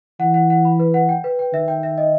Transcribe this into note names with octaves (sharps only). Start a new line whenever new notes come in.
E3 F#5
F#5
F#5
B5
B4
F#5
G5
B4
G5
D#3 E5
G5
E5
D#5